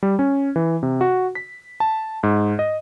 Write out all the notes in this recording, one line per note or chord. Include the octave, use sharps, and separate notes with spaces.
G3
C#4
E3
C3
F#4
B6
A5
G#2
D#5